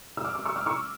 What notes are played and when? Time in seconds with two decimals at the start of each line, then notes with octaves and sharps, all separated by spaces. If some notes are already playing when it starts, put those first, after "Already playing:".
0.17 E6
0.25 D6 F6
0.35 D6 F6
0.45 C#6 E6
0.56 D6 F6
0.66 C#6 E6